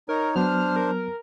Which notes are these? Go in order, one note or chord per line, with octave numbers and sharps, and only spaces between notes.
D#4 A#4 C#5
F#3 B3 D4 C5 F6
A#4